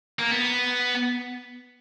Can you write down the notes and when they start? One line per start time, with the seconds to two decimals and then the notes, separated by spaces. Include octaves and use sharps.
0.19 A#3
0.31 B3